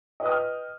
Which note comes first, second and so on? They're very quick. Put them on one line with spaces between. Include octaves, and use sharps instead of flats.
D#5 B4 D#6 G5 F6